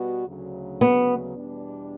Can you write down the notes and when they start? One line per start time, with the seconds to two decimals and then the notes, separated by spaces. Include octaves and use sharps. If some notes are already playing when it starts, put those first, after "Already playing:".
Already playing: B2 G3 B3 F#4
0.27 D2 C#3 F#3
0.81 B3
1.35 E2 B2 G3 D4